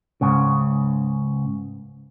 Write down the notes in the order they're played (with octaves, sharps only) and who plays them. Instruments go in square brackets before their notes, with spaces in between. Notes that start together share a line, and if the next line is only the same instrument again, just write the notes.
[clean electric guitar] C#2 G#2 C#3